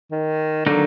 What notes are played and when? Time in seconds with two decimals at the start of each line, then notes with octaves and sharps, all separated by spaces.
0.12 D#3
0.66 D3 D#3 F#3 A#3 D#4